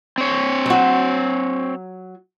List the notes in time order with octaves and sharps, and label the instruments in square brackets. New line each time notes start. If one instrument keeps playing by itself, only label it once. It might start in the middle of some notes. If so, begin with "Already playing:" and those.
[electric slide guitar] C4 C#5
[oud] F#3 F#4